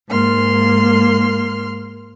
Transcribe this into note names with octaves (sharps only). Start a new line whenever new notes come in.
G#2 A#3 C6 F6